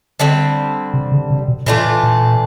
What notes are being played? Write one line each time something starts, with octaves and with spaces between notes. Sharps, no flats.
D3 G3 C4
C3
C#3
C3
B2
A#2 E3 A3 D4 F4
A#2